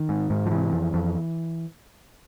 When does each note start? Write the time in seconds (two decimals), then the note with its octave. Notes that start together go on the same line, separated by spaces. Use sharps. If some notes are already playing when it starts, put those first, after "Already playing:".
Already playing: D#3
0.09 G#2
0.30 G#2
0.46 F3
0.51 C3 E3
0.73 F2
0.94 F2